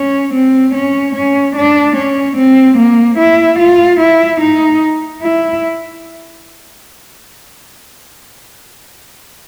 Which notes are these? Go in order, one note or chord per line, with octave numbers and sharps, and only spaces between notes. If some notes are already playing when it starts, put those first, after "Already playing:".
Already playing: C#4
C4
C#4
C#4
D4
C#4
C4
A#3
E4
F4
E4
D#4
E4